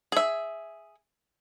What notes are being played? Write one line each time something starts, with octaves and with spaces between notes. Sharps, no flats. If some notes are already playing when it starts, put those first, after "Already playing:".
G#4 E5